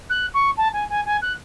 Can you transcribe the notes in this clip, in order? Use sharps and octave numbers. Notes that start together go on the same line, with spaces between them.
F#6
C#6
A5
G#5
G#5
G#5
F#6